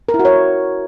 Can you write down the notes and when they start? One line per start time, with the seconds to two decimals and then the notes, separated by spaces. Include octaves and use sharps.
0.09 A#4
0.14 E4
0.19 F#4
0.25 C#5